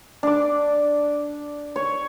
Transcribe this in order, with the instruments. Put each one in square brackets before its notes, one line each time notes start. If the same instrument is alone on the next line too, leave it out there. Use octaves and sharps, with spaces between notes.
[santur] D4 D6
C#5